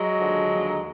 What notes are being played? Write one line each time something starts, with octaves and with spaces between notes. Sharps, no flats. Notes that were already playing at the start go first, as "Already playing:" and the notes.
Already playing: F#3 G#3
D#2 D3 F3
D#2 D3 F3